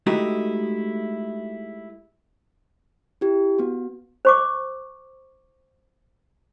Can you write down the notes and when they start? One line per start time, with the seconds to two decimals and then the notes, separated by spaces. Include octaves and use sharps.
0.06 G#3 A3 D#4 E4 F#4 G4
3.21 E4 G4
3.58 B3 F#4
4.25 C5 C#6 D6